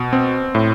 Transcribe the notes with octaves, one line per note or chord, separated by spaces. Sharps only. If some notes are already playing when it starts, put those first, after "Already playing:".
Already playing: B2
C4
A2